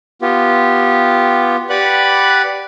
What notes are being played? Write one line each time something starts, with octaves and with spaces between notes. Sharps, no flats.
B3 F4 G4
G4 B4 D5 F#5 B5 F#6